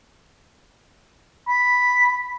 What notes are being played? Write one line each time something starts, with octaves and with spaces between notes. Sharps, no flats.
B5